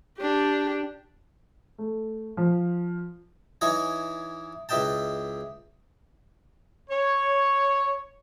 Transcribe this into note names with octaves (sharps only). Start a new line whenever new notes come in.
D4 G4
A3
F3
E3 D#4 E4 C#5 D#5 G#5
C#2 E4 B4 D#5 G5 A5
C#5